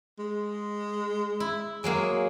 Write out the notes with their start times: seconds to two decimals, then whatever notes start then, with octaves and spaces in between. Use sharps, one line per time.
0.19 G#3
1.40 E4
1.84 F#3 G#3 A#3 G#4